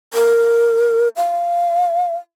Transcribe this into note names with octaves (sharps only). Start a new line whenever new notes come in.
A#4
F5